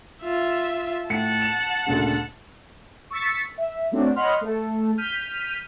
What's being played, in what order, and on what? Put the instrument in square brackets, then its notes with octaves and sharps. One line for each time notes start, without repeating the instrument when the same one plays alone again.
[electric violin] F4 E5
[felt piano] A2 C#7 [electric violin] F#5 A5
[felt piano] E7
D2 A#2 C#3
[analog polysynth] C#6 E6 A6 B6 C#7
E5
F#3 A3 C4 D4 F#4
C#5 D#5 F#5 B5 C6 F6
A3 A4
F6 G6 B6 D#7